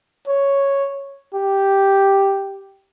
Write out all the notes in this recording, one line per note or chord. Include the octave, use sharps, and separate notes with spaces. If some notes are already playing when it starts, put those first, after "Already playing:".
C#5
G4